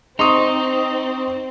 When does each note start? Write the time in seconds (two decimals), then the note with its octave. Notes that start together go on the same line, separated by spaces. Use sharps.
0.19 C4 D#4 C6 C#6 D#6